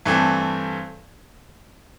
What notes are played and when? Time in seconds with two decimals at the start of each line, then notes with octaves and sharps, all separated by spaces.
0.06 G2 E3 A3 C4